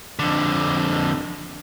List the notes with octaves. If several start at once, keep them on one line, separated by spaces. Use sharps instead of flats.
F2 D3